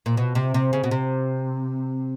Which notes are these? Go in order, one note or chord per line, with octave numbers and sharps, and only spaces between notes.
A#2
B2
C3
C3
C#3
B2
C3